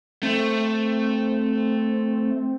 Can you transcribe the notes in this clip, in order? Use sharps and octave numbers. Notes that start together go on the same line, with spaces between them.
A3 C4